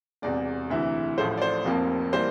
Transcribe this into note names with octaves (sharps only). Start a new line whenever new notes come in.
E1 E2 C3 D5
D2 C3 E3 E5
A1 A2 F3 A3 C5
D5
C5
F1 F2 C3 F3 A#3
E3 G3 A#3 C5